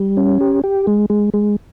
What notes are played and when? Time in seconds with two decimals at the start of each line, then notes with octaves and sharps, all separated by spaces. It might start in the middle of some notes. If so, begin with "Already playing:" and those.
Already playing: G3
0.17 C#4
0.41 G4
0.64 G4
0.87 G#3
1.10 G#3
1.34 G#3